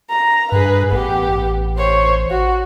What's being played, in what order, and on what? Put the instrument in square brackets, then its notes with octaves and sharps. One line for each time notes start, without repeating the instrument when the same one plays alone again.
[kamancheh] A#5
[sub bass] G2 [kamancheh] G#4 B4
[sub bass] A1 [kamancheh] B3 G4
[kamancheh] C5 C#5
F#4